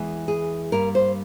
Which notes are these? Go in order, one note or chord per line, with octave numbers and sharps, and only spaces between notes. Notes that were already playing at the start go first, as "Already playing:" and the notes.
Already playing: E2 E3 G#3
G#4
G2 G3 A#3 A#4
C5